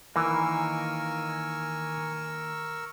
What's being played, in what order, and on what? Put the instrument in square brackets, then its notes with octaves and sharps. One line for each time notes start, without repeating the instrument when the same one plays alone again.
[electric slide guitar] D#3 A#3 [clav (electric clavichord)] E3 [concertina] A#4 C#6 E6 [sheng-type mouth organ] G#5